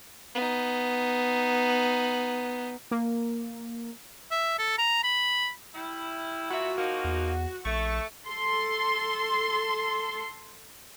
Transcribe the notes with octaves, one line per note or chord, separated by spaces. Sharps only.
B3 D#4
A#3
E5
A4
A#5
B5
G3 E4
A#2 E4 F#4 E5
F3 A#3 D#4 F#4
E2
A#1 A3 C#6
A4 C6